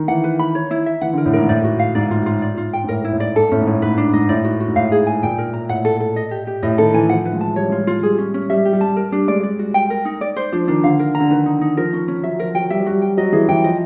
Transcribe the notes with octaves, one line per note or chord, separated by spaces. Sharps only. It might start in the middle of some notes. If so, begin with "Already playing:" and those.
Already playing: D#3
E3 F#5
B4
B5
C#5
E4
E5
E3 F#5
D3
A#4
A2
G#2 A#4
A2 D5
F#4
F5
G#2 D5
F4
F4
D5
F4
G5
G#2
A2 A#4
E4
A2
D5
G#2 A4
A2 C#4
G#2
A2 C#4
G#2 B4
D4
G#2 D#5
A2 D5
F#4
F#4
G#2
A2 F5
G#4
G#5
A#2 G5
A#4
A#5
A2 F#5
A4
A4
D#5
G4
G4
A2 D#5
D#3 A4
E3 G#5
F3 F#5
B4
G#3
A5
G3 C#5
G#3 F4
G3
F4
G3 G#4
C#4
C#4
G3 E5
G4
G3
A5
A#4
G3 D4
G#3 D5
G3 D5
F#4
G5
A#4
D#4
D5
C5
F3 D4
D#3 D4
D3 F5
A#4
D3 A#5
D#3 B4
D#4
D#4
F3 A#4
C#4
C#4
F#3 E5
F3 A#4
F#3 G5
G3 E5
F#3
G3 F#4
G5
F#3 D#5
E3 G#4
E3 G5
F3 D#5